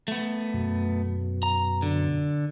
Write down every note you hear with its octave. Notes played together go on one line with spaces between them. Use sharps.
A3 B3
F#2 B2
A#5
D3